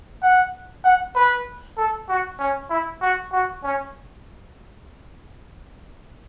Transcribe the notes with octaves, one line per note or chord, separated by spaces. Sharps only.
F#5
F#5
B4
A4
F#4
C#4
E4
F#4
F#4
C#4